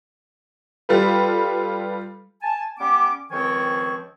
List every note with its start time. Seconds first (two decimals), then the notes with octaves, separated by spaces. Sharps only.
0.89 G3 F4 A4 B4
2.42 G#5 A5
2.79 G3 B3 C#4 D6
3.31 C#2 D#3 F3 C4 G#5 C#6